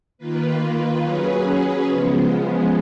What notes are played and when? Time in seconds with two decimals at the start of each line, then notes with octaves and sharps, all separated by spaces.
0.18 D#3 A#3 F4 B4
1.02 F#3 C#4 G#4 B4
1.85 C#3 F3 G#3 B3